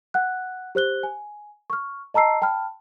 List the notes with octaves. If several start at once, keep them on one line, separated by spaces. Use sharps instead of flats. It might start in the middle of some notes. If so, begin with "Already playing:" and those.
F#5 F#6
G4 C5 F#6 G7
G#5
C#6 F6
D#5 A5 A#5 E6 C7
G5 A5 B5 F6